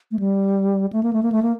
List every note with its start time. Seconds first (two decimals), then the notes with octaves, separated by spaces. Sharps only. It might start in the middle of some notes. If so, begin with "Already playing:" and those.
0.11 A3
0.19 G3
0.93 A3
1.03 A#3
1.13 A3
1.23 A#3
1.32 A3
1.43 A#3